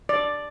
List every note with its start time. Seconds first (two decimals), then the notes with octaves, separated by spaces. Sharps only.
0.09 D5